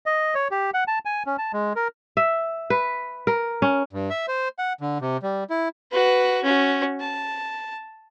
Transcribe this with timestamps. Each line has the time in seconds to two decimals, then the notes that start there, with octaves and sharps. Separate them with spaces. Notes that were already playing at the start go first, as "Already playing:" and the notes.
0.06 D#5
0.35 C#5
0.51 G4
0.74 F#5
0.88 A5
1.05 G#5
1.26 C#4
1.38 A5
1.53 G#3
1.76 A#4
2.17 E5
2.70 B4
3.27 A#4
3.62 C#4
3.93 G2
4.10 E5
4.28 C5
4.59 F#5
4.81 D3
5.02 C3
5.23 G3
5.50 E4
5.91 F#4 B4
6.43 C#4 F#4
7.00 A5